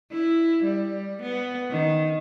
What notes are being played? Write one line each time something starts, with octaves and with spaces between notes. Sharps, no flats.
E4
G3
B3
D#3